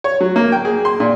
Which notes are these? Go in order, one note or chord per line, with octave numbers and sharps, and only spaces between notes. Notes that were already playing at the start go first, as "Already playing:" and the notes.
C#5
F#3
A#3
G5
G#4
C6
A#2